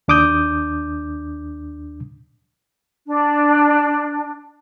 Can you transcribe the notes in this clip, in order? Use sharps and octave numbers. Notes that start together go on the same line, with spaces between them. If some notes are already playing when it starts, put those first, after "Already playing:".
D#2 D4 D6 D#6 G6
D4